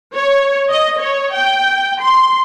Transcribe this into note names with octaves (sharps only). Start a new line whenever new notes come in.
C#5
D#5
C#5
G5
C6